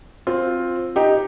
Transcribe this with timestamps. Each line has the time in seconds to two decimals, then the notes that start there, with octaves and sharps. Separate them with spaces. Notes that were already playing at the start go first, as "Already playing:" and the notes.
0.27 C4 F4
0.96 D#4 G4